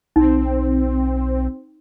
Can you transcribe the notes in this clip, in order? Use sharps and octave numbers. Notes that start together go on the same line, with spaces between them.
B1 C4 D#4